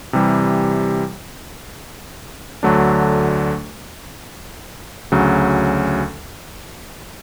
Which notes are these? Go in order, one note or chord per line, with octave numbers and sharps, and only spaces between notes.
C3 E3 G3
D2 D3 F#3 A3 D4
D2 C#3 F#3